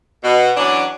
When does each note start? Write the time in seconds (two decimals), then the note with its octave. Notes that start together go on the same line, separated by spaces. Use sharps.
0.23 B2
0.57 E3 F#3 C#4 D4